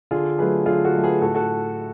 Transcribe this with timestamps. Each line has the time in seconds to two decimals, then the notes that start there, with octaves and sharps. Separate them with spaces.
0.11 D3 F4 G#4
0.38 F#3 A3 G#4 B4
0.66 D3 F4 G#4
0.84 F#4 A4
0.94 F#3 A3
1.04 G#4 B4
1.22 A2 F#4 A4
1.35 F#4 A4